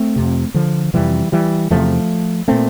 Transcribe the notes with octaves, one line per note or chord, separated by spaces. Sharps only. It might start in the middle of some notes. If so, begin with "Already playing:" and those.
Already playing: A3 C4
F2 C3
D3 F3
F2 C3 E3 G3
E3 G3
E2 C3 F3 A3
A#2 A3 C4